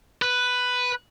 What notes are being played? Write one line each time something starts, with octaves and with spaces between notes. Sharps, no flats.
B4